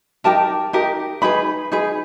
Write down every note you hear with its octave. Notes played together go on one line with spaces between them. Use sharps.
D#4 G4 A#4 A5
D#4 G4 A#4
D#4 G#4 B4 B5
D#4 G#4 B4